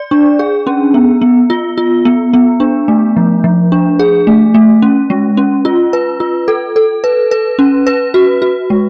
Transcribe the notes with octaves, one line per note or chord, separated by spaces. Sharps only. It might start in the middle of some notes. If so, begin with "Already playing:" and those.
Already playing: D5
D4
G#4
C#4
B3
B3
F4
F4
B3
B3
D4
A3
F3
F3
D4
G#4
A3
A3
C#4
G#3
C#4
F4
B4
F4
A4
A4
B4
B4
C#4
B4
F#4
F#4
G#3